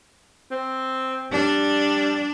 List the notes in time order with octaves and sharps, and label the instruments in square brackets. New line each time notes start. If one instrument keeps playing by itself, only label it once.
[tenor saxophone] C4
[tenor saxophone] G3 [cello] D4